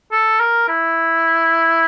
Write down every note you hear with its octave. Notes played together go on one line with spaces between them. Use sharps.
A4
A#4
E4